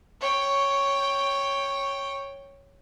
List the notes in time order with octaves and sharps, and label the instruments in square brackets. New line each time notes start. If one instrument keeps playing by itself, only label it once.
[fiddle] C#5 G5